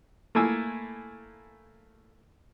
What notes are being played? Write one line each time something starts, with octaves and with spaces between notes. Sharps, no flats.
A3 A#3 E4 G#5 E6